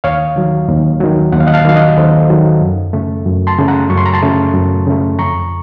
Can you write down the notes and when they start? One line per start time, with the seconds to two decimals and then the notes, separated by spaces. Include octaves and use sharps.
0.04 D#2 C#5 F5
0.36 D#3 F#3
0.69 D#2
1.00 D#3 F#3
1.32 D#2 F#5
1.40 F5
1.47 D#5 F#5
1.54 F5 A5
1.65 D#3 F#3 F5
1.76 D#5 F#5
1.97 D#2 A4 C5
2.30 D#3 F#3
2.61 F#2
2.93 C#3 A3
3.26 F#2
3.47 A5 C6
3.58 C#3 A3
3.68 F#5 A#5
3.90 F#2 C#6
3.97 C6
4.06 A#5
4.14 A5 C6
4.22 C#3 A3
4.54 F#2
4.87 C#3 A3
5.19 F2 A#5 C#6